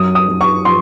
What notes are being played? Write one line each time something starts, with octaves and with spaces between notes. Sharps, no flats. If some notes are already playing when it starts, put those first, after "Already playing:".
Already playing: F#2 D#6
D#6
F#2
C#6
F3 C6